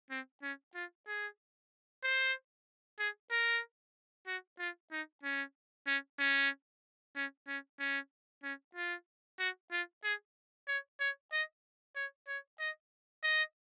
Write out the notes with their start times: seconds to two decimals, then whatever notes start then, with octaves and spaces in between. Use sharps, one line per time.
0.10 C4
0.43 C#4
0.75 F4
1.07 G#4
2.04 C5
2.99 G#4
3.31 A#4
4.27 F#4
4.59 F4
4.92 D#4
5.23 C#4
5.87 C#4
6.20 C#4
7.16 C#4
7.48 C#4
7.80 C#4
8.44 C#4
8.75 F4
9.39 F#4
9.72 F4
10.04 G#4
10.68 C#5
11.00 C#5
11.32 D#5
11.96 C#5
12.28 C#5
12.60 D#5
13.23 D#5